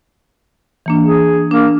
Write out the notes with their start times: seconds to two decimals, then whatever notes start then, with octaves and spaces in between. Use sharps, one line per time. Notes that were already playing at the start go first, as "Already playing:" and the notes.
0.86 E3 A#3 D4
1.05 G#4
1.51 A#3 D4